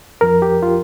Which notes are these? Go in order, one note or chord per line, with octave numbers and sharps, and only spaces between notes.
F2 F3 A#4
G4
F4